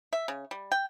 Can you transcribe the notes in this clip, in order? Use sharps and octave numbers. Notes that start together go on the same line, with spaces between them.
E5
C#3
G3
G5